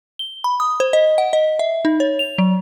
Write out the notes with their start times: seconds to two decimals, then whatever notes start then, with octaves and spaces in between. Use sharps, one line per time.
0.19 G7
0.44 B5
0.60 D#6
0.80 C5
0.93 D#5
1.18 F#5
1.33 D#5
1.59 E5
1.85 D#4
2.00 C#5
2.19 F7
2.38 F#3